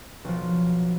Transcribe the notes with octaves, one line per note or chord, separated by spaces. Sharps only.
B1 F3